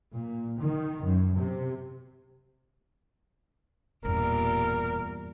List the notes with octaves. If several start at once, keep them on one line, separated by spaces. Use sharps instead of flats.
A#2
D#3
F#2
C3
E1 E2 G2 A#2 G3 A#4